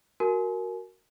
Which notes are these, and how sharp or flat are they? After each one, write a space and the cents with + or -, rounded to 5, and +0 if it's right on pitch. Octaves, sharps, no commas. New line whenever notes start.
F#4 +5 A#4 +0 G#5 +35